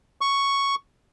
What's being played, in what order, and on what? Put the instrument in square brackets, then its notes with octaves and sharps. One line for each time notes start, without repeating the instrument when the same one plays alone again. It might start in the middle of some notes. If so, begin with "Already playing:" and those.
[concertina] C#6